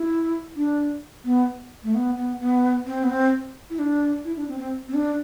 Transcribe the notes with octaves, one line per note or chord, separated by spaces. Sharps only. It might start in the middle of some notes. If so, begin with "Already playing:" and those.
Already playing: E4
D4
B3
A3
B3
B3
B3
C4
B3
C4
E4
D4
E4
D4
C4
C4
C4
D4